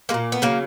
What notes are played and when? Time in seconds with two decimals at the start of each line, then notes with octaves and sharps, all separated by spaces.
0.09 G#3 A#3
0.14 A#2
0.32 B3
0.42 C#3 F#3 A#3